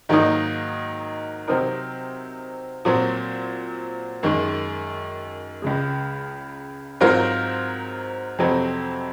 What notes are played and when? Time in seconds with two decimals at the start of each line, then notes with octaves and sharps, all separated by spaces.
0.09 G#2 D#3 F#3 A#3 D#4
1.48 C3 F#3 C4 D#4 A#4
2.85 A#2 F#3 C4
4.23 F#2 D#3 G#3
5.62 C#2 C#3 G#3
7.01 G#2 F#3 C4 F4 A#4
8.38 F2 C3 F#3 C4